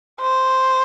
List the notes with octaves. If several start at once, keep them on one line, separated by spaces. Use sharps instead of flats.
C5